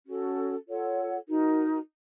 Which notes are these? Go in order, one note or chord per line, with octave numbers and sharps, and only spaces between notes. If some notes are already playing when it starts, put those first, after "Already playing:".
C#4 F#4 A4
F4 A4 C#5 F#5
D#4 F#4 A#4